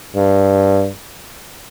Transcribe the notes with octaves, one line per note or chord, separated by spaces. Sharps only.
G2